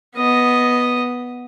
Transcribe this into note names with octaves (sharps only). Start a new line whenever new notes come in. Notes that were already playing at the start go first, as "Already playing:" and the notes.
B3 D#5